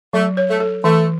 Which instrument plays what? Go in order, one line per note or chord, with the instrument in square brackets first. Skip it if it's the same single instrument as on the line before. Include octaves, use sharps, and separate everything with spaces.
[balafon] F#3 [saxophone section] A3
[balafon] C#5
[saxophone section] A3
[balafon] A4
[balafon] E3 [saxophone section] A3